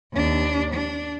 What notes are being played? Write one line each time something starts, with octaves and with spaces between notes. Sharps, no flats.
D#2 D4
D4